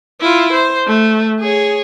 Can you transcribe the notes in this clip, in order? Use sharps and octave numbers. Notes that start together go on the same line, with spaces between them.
E4 F4
C5
A3
G#4 C#5